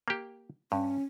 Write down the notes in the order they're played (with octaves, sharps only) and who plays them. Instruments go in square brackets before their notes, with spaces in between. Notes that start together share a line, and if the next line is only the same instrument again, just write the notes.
[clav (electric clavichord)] A#3 G4
[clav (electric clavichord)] G2 [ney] C#4